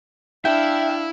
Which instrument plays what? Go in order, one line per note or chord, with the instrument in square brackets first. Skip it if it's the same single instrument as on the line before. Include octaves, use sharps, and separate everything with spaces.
[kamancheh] D4 F5 [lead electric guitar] E4 [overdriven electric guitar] E5 [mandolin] G5